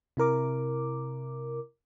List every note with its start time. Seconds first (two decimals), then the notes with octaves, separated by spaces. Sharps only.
0.17 C3 E4 A#4 D6